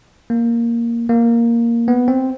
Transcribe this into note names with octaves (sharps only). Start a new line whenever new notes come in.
A#3
A#3
B3
C4